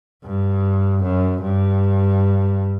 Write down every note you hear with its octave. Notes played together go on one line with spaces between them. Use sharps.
G2
F#2
G2